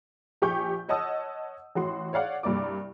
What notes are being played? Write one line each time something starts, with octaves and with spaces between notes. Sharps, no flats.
A#1 G4 G#5 C#6 G6
C#5 D#5 F#5 A5 D#6 E6
A1 F#4 C6
C#5 D5 F5 F#5
C2 G2 A#3 D5 D6